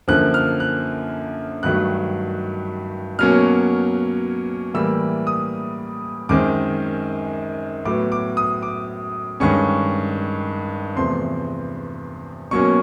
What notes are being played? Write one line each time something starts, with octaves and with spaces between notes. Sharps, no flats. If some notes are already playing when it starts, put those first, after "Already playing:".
F#2 D3 F3 A#3 F#6
F6
F#6
G2 D#3 F#3 A3 F#6
B2 F#3 A#3 C#4 F6
A2 E3 G3 A#3 E6
D#6
F#2 D#3 G#3 C4 D6
A2 F#3 B3 D6
D6
D#6
D6
G2 D#3 G#3 C#4 C#6
E2 C3 F3 A3 C6
B2 F#3 A#3 C#4 C#6